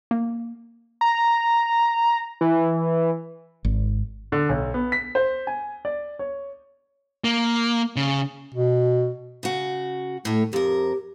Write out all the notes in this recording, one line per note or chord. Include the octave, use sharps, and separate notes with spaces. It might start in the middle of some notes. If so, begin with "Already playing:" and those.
A#3
A#5
E3
G#1
D3
B1
B3
B6
C5
G#5
D5
C#5
A#3
C#3
B2
C#3 F#4
A2 A3 C#5
F2 G4 A#4